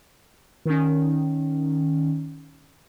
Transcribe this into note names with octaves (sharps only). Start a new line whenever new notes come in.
D#3 C#4